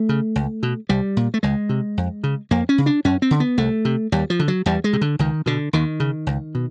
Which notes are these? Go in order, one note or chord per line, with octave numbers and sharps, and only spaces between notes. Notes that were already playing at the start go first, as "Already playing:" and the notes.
Already playing: A3
C#3
C#2
B2
C2 G3
A#2
A3
C#2 G#3
C3
F2
C#3
F2 A#3
C#4
C#3
D4
F#2 C#4
C4
D3
B3
C2 A3
C3
D#2 G3
F3
D3
F#3
E2 G3
G#3
C3
D3
C#2 D#3
B2 D3
D#2 D#3
C#3
C#2
B2